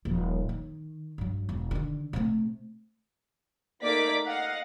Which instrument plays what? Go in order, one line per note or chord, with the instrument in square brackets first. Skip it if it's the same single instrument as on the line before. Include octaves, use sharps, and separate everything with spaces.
[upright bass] D#1 F3
D#3
G2 F#3
E1
D3 D#3
C3 A3
[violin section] A3 A#3 D#4 D5 D6 B6
D#5 F5 F#5